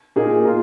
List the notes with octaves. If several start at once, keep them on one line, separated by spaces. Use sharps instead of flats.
A#2 A#3 D#4 G#4
F4 A#4